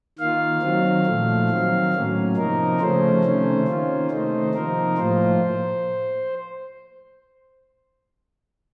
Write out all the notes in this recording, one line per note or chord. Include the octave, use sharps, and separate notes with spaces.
D#3 A#3 F4 F5
D#3 F#3 C4
A#2 F3 A3
D#3 F#3 C4
A2 F#3 A#3 C#4
C3 F3 A#3 D#4 A#4
C#3 F3 A3 C#4 C5
C3 D#3 A3 C#4
D#3 A#3 C#4 F4
C3 D#3 A3 D#4 C5
C3 F3 A#3 D#4 A#4
A2 F3 A#3 F4 C5